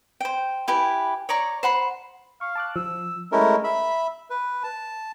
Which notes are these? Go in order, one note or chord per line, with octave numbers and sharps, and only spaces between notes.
C5 G5
E4 G4 B4 G#5
C#5 D5 A#5 C#6
C5 F#5 B5 C6
F5 C#6
A5 D6 F#6
F3 E6
G#3 A3 C#4 E4 A#4
E5 B5
B4
A5